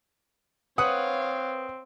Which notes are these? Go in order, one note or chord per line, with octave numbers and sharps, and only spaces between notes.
C4 B4 C#5 F5 F#5 D#6